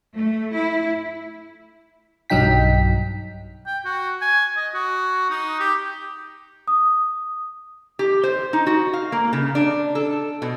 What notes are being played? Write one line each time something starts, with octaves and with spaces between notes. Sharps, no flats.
A3
E4
B1 G2 F#3 D#4 G5 B6
G5
F#4
G#5
D#5
F#4
D#4
G4
D#6
G4
C5
D#4
F#4
F5
A#3
C#3
D4
A4
B2